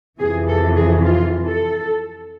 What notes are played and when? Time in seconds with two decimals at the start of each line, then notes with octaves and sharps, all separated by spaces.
0.18 F2 C3 E3 G#4
0.47 A4
0.75 G#4
1.04 F4
1.46 A4